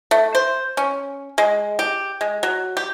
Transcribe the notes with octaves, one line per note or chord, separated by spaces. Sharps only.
A3
C5
C#4
G#3
G4
G#3
F#3
G4